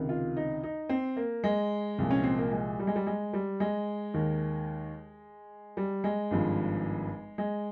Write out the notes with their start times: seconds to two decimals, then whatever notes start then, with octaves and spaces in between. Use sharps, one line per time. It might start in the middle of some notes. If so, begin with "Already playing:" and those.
Already playing: C#2 C3 D#3
0.09 F4
0.37 D#4
0.63 D#4
0.89 C4
1.16 A#3
1.44 G#3
1.98 C2 A#2 F3
2.11 C#4
2.24 C4
2.38 A#3
2.52 G#3
2.79 G3
2.87 G#3
2.95 G3
3.07 G#3
3.33 G3
3.60 G#3
4.14 D#2 D#3
5.77 G3
6.04 G#3
6.31 G#1 G2 F3
7.38 G#3